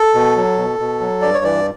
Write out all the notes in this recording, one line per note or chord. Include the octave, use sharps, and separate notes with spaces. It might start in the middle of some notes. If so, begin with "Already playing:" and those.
Already playing: A4
B2
F#3
B2
B2
F#3
G2 D5
C#5
E3 D5